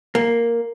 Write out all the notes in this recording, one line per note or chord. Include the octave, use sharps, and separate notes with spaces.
A#3